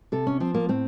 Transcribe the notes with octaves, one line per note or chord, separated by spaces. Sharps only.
C3 A4
C#4
F3 C4
A#3
A2 C4